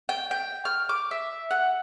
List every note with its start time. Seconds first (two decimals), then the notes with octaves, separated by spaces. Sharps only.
0.09 G5
0.31 G5
0.65 F6
0.89 D6
1.11 E5
1.51 F#5